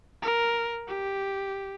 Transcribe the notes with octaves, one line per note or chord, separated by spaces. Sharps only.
A#4
G4